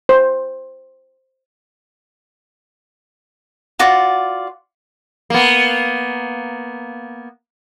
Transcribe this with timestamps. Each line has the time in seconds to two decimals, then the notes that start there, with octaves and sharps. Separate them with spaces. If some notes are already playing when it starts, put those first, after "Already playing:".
0.09 C5
3.79 F4 F#4 D5
5.30 A#3 B3